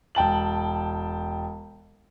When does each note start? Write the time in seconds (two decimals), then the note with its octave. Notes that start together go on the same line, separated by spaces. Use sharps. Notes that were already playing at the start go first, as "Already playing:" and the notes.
0.15 E1 G5 A5 F#7